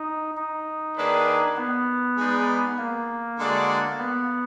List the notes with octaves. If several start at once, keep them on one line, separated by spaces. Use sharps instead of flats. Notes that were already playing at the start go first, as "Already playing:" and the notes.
Already playing: D#4
D#4
D#3 A#3 D4 G#4 B4
B3
G#3 D#4 G#4 B4 D5
A#3
D3 G#3 D4 F#4 D5
B3